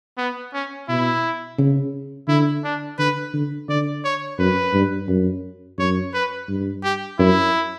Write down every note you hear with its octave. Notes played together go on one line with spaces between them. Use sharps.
B3
C#4
B2 E4
C#3
D3 E4
D4
D3 B4
D3
D3 D5
C#5
F#2 B4
G2
F#2
F#2 C#5
B4
G2
G4
F#2 E4